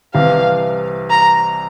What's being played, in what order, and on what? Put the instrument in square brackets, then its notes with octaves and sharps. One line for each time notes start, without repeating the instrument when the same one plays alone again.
[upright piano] C2 C3 E3 [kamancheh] F5
[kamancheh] A#5